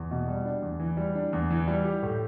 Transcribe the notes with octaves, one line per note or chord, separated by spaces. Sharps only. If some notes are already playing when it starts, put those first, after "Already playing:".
Already playing: E2
B2
G3
D4
E2
E3
G3
D4
E2
E3
G3
G4
A2